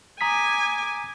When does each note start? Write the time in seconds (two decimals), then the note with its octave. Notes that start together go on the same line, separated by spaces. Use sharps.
0.21 G#5 A#5 D6 D#6 B6